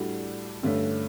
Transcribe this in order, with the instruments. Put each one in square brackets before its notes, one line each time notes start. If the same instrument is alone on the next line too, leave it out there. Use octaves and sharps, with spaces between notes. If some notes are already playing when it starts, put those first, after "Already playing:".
Already playing: [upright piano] A2 G3 D4 F#4
G2 D3 A3 C#4